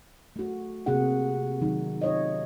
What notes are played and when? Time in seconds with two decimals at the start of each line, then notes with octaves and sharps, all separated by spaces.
0.36 A3 F#4
0.86 C3 A#3 C4 F#4 G#4 F#5
1.61 C3 D#3 F#3 D#4
2.02 F4 C#5 D#5